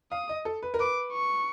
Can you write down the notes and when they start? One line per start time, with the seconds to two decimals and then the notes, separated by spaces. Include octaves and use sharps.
0.12 F5 D#6
0.29 D#5
0.45 A4
0.63 B4
0.74 A#4
0.79 B4 D6
1.13 C#6